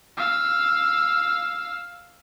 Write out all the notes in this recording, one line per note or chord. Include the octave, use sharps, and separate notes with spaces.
F5 E6